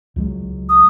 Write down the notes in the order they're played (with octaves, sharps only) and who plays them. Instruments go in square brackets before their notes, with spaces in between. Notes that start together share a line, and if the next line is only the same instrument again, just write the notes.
[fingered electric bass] C#2 F#3 G#3
[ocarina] D#6